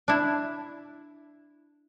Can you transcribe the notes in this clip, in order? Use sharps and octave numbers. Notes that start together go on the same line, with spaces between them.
D4 E4